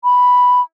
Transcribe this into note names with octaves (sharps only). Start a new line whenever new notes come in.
B5